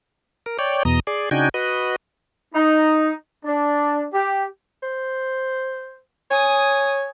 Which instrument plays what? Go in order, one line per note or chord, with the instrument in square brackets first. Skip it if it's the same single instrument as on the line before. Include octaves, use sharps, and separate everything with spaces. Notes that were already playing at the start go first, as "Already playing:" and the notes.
[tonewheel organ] A#4
C#5 D5 G5
E2 B2 A#5 D#6
G#4 D5
C#3 D4 D#4 F#4 G5 G#5
F#4 B4 D#5
[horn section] D#4
D4
G4
[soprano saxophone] C5
[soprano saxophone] C#5 [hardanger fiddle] G#5 D#6